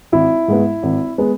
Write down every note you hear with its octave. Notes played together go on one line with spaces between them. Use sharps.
G#1 E4
G#2 G#3 B3
G#1
G#3 B3